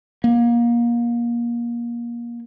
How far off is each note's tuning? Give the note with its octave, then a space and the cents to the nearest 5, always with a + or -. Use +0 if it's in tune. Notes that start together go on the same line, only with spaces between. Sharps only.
A#3 +25